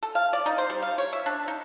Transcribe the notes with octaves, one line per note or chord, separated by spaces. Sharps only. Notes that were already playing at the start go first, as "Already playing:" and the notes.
A4
F5
D5
D#4
C5
G3
F5
C#5
E5
D4
D#4